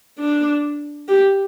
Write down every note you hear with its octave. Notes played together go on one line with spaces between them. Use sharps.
D4
G4